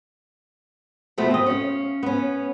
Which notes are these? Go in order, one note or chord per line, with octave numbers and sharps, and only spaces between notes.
B2 F3 A3 B3
C4 D#5
C#4 F5
B3 C#4